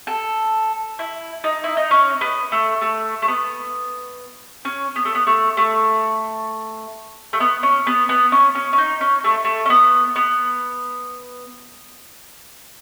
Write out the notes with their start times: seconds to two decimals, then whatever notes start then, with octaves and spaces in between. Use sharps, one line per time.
0.07 A4
0.99 E4
1.44 D#4
1.64 E4
1.77 D#4
1.91 C#4
2.21 B3
2.52 A3
2.81 A3
3.22 A3
3.28 B3
4.65 C#4
4.96 B3
5.05 A3
5.15 B3
5.27 A3
5.57 A3
7.33 A3
7.40 B3
7.63 C#4
7.87 B3
8.09 B3
8.32 C#4
8.55 C#4
8.73 C#4
8.78 D#4
9.01 C#4
9.24 A3
9.44 A3
9.66 C#4
9.70 B3
10.16 B3